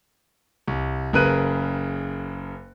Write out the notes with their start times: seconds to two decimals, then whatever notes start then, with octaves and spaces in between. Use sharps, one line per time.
0.67 C2
1.13 F#1 C#3 A#4 B4 F#6 D#7